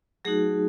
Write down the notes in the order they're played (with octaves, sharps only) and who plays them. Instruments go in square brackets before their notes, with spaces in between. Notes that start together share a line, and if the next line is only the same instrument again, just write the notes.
[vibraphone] F#3 A3 D#4 F#4 G#4